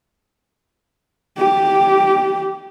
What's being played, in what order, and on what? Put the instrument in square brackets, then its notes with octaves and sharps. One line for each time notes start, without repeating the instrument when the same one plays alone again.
[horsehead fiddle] G4